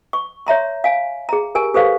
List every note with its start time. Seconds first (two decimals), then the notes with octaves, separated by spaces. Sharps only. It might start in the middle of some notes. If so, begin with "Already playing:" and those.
0.13 C#6
0.47 C#5 E5 A#5 C6
0.84 F5 G#5
1.29 G#4 A#5
1.55 G4 A#4 G#5
1.74 G4 A4 B4 C5 F5